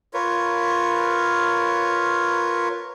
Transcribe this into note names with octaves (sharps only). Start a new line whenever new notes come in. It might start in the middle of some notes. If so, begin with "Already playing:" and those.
F4 A#4 B4 C#5